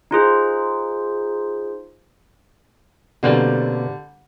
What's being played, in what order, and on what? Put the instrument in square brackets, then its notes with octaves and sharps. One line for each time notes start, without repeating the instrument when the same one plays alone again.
[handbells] D#4 F4 G#4 C5
[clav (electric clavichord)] B2 A#3 C4 [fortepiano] D3 G3